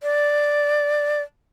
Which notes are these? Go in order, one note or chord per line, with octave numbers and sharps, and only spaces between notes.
D5